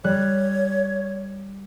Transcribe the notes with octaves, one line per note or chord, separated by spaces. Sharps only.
G3 C#5 F#6